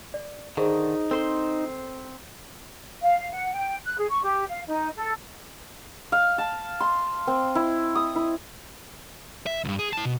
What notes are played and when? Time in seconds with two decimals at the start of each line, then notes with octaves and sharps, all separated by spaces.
0.14 D5
0.57 D3 D#3 D#4 G#4 C5
1.11 C4 A4 C5 C6
3.02 F5
3.19 F5
3.32 F#5
3.53 G5
3.84 F#6
3.98 G#4
4.09 C#6
4.23 G4
4.47 F5
4.67 D#4
4.96 A4
6.12 F5
6.38 A5
6.80 C6
7.27 C4
7.55 E4
7.95 D#6
8.15 E4
9.46 E5
9.65 C#2 G2
9.79 G#4
9.93 E4 A5
10.05 B2